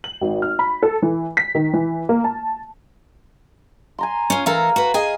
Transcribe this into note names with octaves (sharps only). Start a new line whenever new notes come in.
F#7
G#1
F6
B5
A4
E3
B6
D#3
E3
A#3
A5
G#5 A#5 C6
C#4 F4
E3 A4 A#4 F5 A#5
F#4 B4
G#4 D#5 G#5